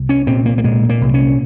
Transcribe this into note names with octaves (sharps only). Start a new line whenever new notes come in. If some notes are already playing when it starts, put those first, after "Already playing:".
Already playing: C2
C#4
A#2 C4
A#3
A#3
A#2 G#3
A#3
C2
C#4